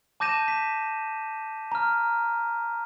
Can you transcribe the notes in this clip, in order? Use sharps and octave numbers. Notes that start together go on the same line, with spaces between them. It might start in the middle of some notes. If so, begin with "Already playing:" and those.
A5 D6 G6 A#6 D#7 E7
B6
A#5 F6